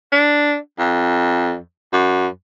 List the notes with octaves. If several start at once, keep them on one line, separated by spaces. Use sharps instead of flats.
D4
F2
F#2